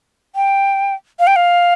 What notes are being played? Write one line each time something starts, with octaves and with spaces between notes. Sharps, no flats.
G5
F5
G5
F5